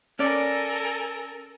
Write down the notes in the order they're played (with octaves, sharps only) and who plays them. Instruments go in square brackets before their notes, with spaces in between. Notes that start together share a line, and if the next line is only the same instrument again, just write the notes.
[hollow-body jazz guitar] C#4 D5 [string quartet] A4 A#4 G#5